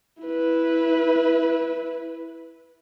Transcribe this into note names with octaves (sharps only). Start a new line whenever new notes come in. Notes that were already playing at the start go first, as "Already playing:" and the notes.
E4 B4